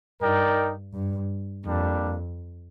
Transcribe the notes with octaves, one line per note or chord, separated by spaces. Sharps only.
G2 D#4 A#4 D5 G5
G2
F2 G3 A#3 D4